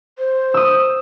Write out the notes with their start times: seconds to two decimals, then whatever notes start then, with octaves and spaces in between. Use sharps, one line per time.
0.18 C5
0.54 D#6 E6